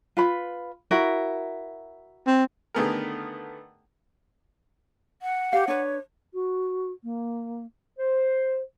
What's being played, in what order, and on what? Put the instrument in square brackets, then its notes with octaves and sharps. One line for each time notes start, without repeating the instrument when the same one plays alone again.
[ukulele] F4 B4 B5
E4 F#4 A#4
[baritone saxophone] C4
[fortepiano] D3 D#3 A3 B3 G#4 A#4
[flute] F#5
[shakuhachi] G4 [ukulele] F5
[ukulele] D4 B4 [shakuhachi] C#5
[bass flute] F#4
A#3
[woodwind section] C5